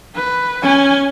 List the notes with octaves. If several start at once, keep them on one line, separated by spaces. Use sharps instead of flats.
B4
C#4 G#5